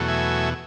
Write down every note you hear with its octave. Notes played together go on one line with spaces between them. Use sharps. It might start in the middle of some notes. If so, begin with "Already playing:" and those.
Already playing: E2 B2 F#3 A3
E5 G#5